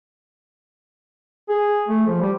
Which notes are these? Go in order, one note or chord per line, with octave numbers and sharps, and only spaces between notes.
G#4
A3
F3
G3